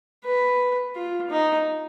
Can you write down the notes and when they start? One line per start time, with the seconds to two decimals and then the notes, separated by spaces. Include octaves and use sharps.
0.25 B4
0.95 F4
1.30 D#4